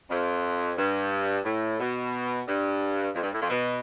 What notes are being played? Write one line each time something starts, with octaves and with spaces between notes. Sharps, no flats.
F2
G2
A2
B2
G2
F2
G2
A2
F2
B2